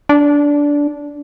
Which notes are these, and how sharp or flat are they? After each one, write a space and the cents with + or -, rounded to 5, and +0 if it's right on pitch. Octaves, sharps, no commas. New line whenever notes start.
D4 -15